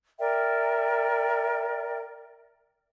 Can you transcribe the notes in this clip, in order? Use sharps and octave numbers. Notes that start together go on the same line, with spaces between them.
A#4 D5 E5 G5